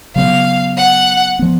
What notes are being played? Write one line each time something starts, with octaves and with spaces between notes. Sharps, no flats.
C#3 F#3 B3 F5
F#5
F3 B3